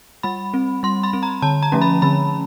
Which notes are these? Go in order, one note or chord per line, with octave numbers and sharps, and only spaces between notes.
G3 B5
C4
G3 C6
B5
C4
A#5
D3 A5
A#5
F3 A3 C#4
B5
D3 B5